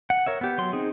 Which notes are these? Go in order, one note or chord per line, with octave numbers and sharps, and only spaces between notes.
F#5
A#4 C#5 E5
B3 G4
F#3 C6
C4 D#4 G#4